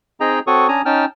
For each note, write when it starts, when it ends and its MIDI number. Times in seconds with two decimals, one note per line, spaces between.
0.20 0.39 60
0.20 0.39 63
0.20 0.39 68
0.20 0.39 75
0.20 0.39 79
0.20 0.39 82
0.47 0.68 60
0.47 0.68 66
0.47 0.68 69
0.47 0.68 73
0.47 0.68 85
0.47 0.68 87
0.68 0.82 61
0.68 0.82 62
0.68 0.82 80
0.68 0.82 82
0.68 0.82 87
0.86 1.05 61
0.86 1.05 63
0.86 1.05 79
0.86 1.05 81
0.86 1.05 89